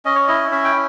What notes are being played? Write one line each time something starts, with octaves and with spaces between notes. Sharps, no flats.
C#4 D#5
C#5
E4 D#5
C#4 E5
G5